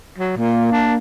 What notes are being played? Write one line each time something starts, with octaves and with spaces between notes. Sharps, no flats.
F#3
A#2 A#3
D4